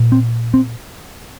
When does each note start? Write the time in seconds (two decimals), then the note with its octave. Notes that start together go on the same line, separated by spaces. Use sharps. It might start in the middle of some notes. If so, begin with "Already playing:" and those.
Already playing: A#2
0.12 C4
0.54 C4